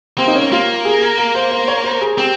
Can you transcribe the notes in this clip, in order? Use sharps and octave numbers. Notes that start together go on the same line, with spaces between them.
A#3 C4
D#4
C#4
A#3 F4
G#4
A#4
A#4
C5
C5
C#5
C5
G#4
C4 G4